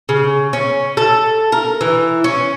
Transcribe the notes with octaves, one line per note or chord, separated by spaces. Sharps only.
C#3
C#4
A4
A#4
E3
C#4